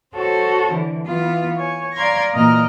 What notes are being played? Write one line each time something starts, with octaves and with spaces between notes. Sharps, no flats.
F#4 A4 C5 C#5
D3 E3
E3 B3 F4
C#5 G#5
D5 F5 A#5 C6 G#6 A#6
A#2 E3 A#3 D#5 A#5 F6